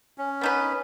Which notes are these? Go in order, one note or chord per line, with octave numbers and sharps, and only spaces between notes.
C#4
B3 D#4 B4